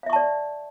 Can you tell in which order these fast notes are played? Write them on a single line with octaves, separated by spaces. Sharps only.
F5 E5 C#6 A5 D5